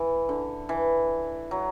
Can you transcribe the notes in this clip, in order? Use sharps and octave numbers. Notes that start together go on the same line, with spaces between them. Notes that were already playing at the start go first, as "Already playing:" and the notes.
Already playing: E3
D3
E3
F#3